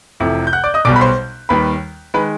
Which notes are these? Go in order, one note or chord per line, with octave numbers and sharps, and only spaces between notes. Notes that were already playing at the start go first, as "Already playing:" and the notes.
F1 F2 C3 E3
G6
F#5 F#6
D5 D6
D#5 D#6
B1 B2 G3 D5 D6
B5
C5 C6
D#2 D#3 G3 B4 B5
D#3 G#3 B4 B5